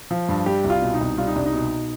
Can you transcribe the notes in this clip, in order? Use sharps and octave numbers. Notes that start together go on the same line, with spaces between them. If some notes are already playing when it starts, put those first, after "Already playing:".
F3
G2
G3 G4
C2
F4
B2
D#4
C2
G3 F4
D#4
C2 D4
D#4
B2